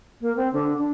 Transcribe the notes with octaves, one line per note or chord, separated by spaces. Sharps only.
A#3
C4
D3
D4